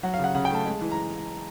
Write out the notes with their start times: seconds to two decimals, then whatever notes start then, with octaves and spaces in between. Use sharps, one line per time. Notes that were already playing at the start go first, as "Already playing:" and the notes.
0.03 F#3 F#5
0.14 F5
0.19 C#3 F#5
0.35 C#3 F#5
0.45 G5
0.50 A3 A5
0.65 G#3
0.81 E3
0.92 A#5